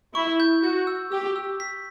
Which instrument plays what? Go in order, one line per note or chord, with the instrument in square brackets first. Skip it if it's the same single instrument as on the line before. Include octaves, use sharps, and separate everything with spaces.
[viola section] E4 [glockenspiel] C#6
[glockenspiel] G6
[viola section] F#4 [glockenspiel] G6
[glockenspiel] E6
[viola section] G4 [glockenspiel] E6
[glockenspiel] E6
B6